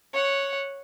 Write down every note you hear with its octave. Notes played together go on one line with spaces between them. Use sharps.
C#5 F#5